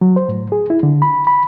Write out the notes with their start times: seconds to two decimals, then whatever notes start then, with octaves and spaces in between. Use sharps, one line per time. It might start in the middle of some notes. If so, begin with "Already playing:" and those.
0.01 F#3
0.16 C5
0.29 A2
0.52 G#4
0.70 E4
0.83 D3
1.02 B5
1.27 B5